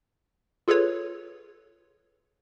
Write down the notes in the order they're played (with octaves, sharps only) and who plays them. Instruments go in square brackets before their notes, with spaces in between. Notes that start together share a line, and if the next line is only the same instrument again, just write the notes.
[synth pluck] F4 G#4 A4 B4 C#5